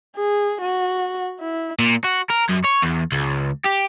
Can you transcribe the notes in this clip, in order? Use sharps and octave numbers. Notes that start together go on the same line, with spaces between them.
G#4
F#4
E4
A#2
F#4
A#4
F#2
C#5
E2
C#2
G4